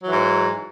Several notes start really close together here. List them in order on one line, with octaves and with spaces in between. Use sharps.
F#3 E3 G#2